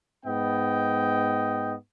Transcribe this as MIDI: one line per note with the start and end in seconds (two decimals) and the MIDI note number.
0.25 1.74 44
0.25 1.74 59
0.25 1.74 75
0.25 1.74 79